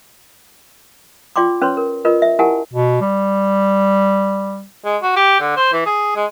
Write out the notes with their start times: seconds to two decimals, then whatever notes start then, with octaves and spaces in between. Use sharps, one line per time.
1.36 F4 D5 G5 C6 D6
1.62 C#4 B4 C#5 C6
1.77 A#4
2.05 F4 A#4 B4 D#5
2.22 E5
2.39 E4 G4 A#4 F#5 G#5 A5
2.74 B2
3.01 G3
4.85 G#3
5.02 F#4
5.16 G4
5.40 D3
5.56 C5
5.73 E3
5.86 G#4
6.16 G#3